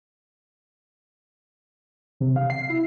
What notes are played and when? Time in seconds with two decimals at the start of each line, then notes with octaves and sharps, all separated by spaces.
2.20 C3
2.36 F5
2.50 C7
2.70 E4